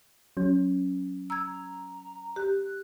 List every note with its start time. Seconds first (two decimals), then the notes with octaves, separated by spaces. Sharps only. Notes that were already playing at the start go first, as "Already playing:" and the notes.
0.37 F#3 C#4
1.30 A#5 E6 G#6
2.36 G4 F#6